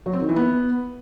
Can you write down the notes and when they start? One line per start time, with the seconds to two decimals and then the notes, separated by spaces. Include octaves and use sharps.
0.06 F#3
0.13 C4
0.21 D#3
0.29 E3
0.36 B3